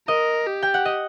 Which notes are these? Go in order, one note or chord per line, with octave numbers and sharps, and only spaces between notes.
A#4 D#5
G4
G5
F#5
D#5